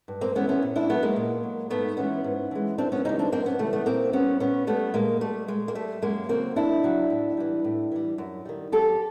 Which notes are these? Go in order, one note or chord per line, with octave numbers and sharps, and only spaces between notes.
G2
A#3 C4
E3 G#3 B3 C#4
B3 C#4
A#2
D4 E4
F#3 A3 B3
G#3 A#3
A#2
F#3
G#2 A3 B3
E3 G#3 B3 C#4
G#2
E3 G#3
F#2 C4 D4
B3 C#4
C#3 E3 G3 C#4 D#4
C4 D4
F#2 A#3 C4
B3 C#4
C#3 E3 G3 A3
A3 B3
A#2 A#3 C4
G3 B3 C#4
A#2 B3 C#4
G3 A3 B3
A#2 G#3 A#3
G3 A3
A#2 G#3
A#3
G3 A3
F#2 G#3 A#3
C#3 F#3 A#3 C4
F#2 D4 E4
C#3 F#3
A2
E3 G3
A2
E3 G3
F#2
D#3 G3
F#2 G4 A4